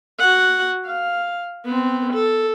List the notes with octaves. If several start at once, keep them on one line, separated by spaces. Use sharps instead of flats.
F#4 F#5
F5
B3 C4
A4